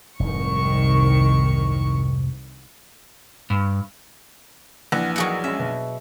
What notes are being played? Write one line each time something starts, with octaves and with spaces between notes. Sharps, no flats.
F1 C2 G#2 D#3 C#6
G2
A#1 E3 F#5
F#3 D#4 G#4 A#4 F#5 C#6
G#3 C#4 E5
B2